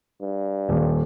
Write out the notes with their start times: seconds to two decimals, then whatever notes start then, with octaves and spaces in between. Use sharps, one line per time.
0.21 G2
0.69 D#1